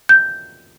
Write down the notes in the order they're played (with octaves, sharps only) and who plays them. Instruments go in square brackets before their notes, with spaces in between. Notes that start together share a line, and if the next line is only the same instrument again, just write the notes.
[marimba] G6